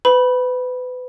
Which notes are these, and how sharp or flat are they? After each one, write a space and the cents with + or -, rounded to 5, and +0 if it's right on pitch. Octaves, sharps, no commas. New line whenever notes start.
B4 +30 B5 -10